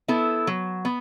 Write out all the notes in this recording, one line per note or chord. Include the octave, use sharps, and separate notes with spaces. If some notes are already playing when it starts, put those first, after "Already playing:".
B3 E4 A4
F#3
B3